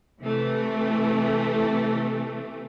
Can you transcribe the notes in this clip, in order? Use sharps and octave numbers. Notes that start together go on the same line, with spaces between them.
C3 E3 A3